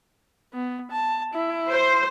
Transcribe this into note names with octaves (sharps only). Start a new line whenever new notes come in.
B3
A5
E4
C5